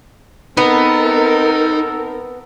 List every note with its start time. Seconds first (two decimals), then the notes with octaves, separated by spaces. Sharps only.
0.57 B3 C4 D#4 A4 A#4